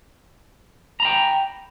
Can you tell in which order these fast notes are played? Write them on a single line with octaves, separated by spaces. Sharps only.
A#5 B5 G5